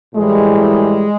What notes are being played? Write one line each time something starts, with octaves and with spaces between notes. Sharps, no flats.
A2 E3 G3 G#3